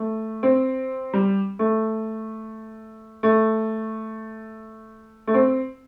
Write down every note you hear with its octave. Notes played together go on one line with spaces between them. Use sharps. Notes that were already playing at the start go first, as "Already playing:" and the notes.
Already playing: A3
C4
G3
A3
A3
A3
C4